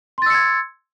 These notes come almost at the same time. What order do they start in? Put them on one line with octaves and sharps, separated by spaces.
C6 A6 E6 C#7 G#6